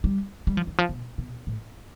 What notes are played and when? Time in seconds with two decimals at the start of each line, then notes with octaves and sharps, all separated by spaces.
0.04 G3
0.47 G3
0.57 F3
0.67 E3
0.78 F3
0.89 B2
1.18 B2
1.47 A2